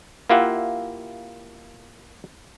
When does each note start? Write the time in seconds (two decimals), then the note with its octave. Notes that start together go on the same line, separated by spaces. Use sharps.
0.29 A#3 E4 F4 G4 E5 F#5